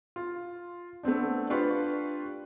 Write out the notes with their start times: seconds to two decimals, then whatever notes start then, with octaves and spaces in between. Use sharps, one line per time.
0.16 F4
1.03 A3 B3 C4 D4
1.50 D4 F4 G4 B4 C6 C#6